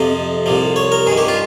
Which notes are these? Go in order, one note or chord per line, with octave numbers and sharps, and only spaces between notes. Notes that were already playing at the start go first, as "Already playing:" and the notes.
Already playing: F2 C3 F3 D#5
C2 C3 F3
C#5
A#4
G2 D#3 G#4
G4
F4